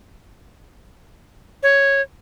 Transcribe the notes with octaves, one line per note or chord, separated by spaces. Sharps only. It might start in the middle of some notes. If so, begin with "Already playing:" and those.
C#5